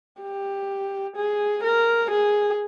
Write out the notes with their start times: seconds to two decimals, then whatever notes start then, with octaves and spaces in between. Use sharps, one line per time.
0.22 G4
1.16 G#4
1.63 A#4
2.11 G#4